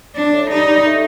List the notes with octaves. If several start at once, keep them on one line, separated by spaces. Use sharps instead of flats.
D4
A2
G3 D#4
G3
A3